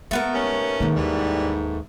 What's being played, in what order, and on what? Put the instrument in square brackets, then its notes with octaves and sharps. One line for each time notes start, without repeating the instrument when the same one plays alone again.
[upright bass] G#3 [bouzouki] A3 B3 A#4
[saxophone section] D#2 C#4
[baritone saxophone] G#2 [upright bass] D#3 A#3
[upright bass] D#2 [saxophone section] E3 G3